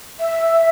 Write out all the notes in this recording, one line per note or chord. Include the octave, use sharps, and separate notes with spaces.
E5